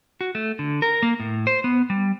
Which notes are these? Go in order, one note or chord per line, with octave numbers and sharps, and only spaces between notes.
F#4
A3
D3
A#4
A#3
A2
C5
B3
G3